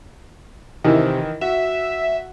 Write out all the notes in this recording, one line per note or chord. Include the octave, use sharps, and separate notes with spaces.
C3 D#3 E3 E4
F#4 E5